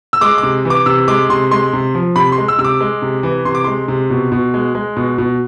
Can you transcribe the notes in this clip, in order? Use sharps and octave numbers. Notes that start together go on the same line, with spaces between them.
E6
G#3 D6
D6
C3
E3
D6
C3 E6
G#3 D6
C3 C6
G#3 C6
C3
F3
C3 B5
C6
G#3
E6
C3 E6
D6
G#3
C3
E3
C3 C6
D6
G#3 C6
C3
B2
B2
G#3
G#3
B2
B2